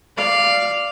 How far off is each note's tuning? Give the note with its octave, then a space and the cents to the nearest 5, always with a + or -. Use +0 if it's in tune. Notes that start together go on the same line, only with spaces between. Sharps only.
D5 +0 F5 -5